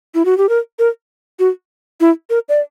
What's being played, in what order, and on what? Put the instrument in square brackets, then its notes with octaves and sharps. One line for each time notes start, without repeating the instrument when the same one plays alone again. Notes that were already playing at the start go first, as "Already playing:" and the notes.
[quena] E4
F#4
G4
A#4
A#4
F#4
E4
A#4
D5